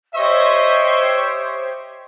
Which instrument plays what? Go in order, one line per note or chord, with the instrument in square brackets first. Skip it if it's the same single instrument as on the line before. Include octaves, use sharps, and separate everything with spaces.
[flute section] G4 C5 C#5 [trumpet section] D#5 E5 C#6